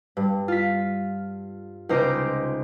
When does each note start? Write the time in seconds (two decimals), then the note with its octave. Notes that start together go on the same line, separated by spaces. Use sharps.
0.17 G2
0.48 F4 B6
1.89 C#2 C3 D#4 C5 D#5 D6